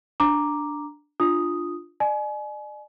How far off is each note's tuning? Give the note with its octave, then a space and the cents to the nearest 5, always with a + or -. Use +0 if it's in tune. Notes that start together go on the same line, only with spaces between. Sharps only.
D4 +0 A#5 +0 D6 +0
D4 +20 F4 +0 D#6 +0
D5 +40 G#5 +35